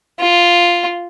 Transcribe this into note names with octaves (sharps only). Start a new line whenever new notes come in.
F4